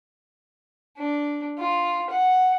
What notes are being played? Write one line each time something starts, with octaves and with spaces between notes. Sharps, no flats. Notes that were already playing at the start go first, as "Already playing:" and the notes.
D4
F4
F#5